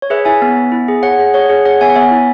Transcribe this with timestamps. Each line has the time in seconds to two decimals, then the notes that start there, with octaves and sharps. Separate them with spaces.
0.02 C#5
0.10 G#4 B4 E5
0.25 E4 E5 G#5
0.42 B3
0.57 B3
0.72 E4
0.88 G#4
1.03 G#4 C#5 F#5
1.19 G#4
1.34 G#4 C#5 F#5
1.50 G#4
1.65 G#4 C#5 F#5
1.81 B3 E5 G#5
1.90 F#5
1.95 B3 E5 G#5
2.11 E4